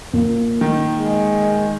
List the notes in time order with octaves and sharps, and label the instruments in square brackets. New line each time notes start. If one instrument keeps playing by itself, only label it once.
[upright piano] A#2
[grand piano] D#3
[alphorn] G#3